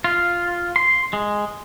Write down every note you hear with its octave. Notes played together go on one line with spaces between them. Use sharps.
F4
C6
G#3